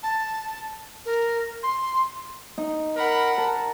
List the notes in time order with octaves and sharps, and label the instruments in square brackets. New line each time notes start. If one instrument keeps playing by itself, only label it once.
[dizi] A5
A#4
C6
[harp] D#4
[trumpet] A#4 [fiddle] F#5 B5
[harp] A#4 [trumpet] A5